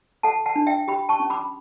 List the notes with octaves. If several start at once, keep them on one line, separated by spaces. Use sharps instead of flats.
A4 F#5 A5
F#5 A5
D4
E5 G5
G4 G5 B5
A5 C#6
C#4
B5 D6